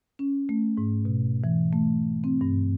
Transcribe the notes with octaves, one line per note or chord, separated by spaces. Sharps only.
C#4
A3
G#2
B2
E3
A3
C4
G2